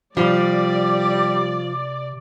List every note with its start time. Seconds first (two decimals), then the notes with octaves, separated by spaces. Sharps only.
0.17 C3 F3 G3 D5